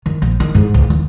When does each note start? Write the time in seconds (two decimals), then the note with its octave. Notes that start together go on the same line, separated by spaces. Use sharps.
0.06 D#3
0.22 A#1
0.40 D#3
0.55 G#2
0.74 C#2
0.90 D#2